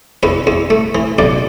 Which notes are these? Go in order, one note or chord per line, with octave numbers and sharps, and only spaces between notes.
E2 B4
E2
A3
E3
B1 D5